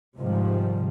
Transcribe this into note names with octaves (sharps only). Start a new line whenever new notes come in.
G#2 C3 D#3 F3 G3